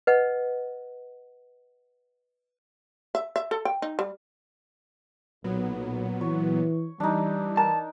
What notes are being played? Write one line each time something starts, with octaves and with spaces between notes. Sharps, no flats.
B4 D#5 F#5
E5
E5
A4
G5
D#4
G3
B1 A#2 F#3 B3
E3 C#5
E3 G3 D4 D#4
A#4 A5